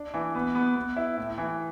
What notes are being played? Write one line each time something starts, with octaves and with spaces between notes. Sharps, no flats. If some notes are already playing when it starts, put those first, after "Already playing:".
Already playing: D4
E3
B3
B3
B3
E4
A2
E3